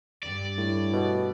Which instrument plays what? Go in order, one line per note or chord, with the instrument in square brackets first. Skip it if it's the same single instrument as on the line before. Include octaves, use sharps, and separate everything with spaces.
[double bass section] G2 [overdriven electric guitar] D5
[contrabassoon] A2
[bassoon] B2